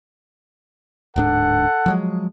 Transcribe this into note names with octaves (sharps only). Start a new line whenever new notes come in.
D1 G#2 D4 A4 F#5
F3 F#3 G#3